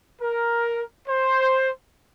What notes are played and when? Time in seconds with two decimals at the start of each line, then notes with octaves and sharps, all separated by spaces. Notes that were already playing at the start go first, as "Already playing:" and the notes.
0.22 A#4
1.08 C5